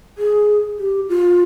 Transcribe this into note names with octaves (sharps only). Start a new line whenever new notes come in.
G#4
G4
F4